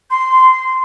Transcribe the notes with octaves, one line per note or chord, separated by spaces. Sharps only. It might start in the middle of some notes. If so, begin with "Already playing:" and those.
C6